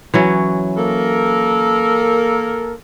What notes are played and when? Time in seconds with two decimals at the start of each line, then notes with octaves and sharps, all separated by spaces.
0.14 E3 F#3 C#4
0.77 A#3 A4 A#4